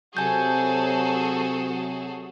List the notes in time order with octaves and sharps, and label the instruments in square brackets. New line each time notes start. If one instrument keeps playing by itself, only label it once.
[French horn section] C3 F#3 [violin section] F#4 G#4 A4 [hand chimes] G#5 G6